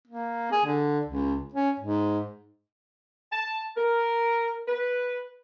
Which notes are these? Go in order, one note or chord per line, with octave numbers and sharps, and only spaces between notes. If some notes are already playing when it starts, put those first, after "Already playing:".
A#3
G#4
D3
C#2
C#4
G#2
A5
A#4
B4